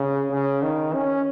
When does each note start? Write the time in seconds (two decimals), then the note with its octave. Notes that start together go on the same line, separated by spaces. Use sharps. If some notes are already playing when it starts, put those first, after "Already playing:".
Already playing: C#3
0.31 C#3
0.63 D#3
0.94 C#4